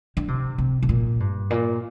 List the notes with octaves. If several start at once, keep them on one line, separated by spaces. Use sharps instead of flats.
D3
C3
C3
C3
A#2
G2
A#2